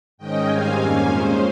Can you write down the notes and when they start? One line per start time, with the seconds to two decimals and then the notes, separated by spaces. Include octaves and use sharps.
0.17 G#2 D#3 G#3 C#4 D#5 G5
0.47 G#2 D#3 G3 C4 F5 G#5
0.77 F2 D#3 A#3 C#4
1.07 A#2 G#3 C#4 C5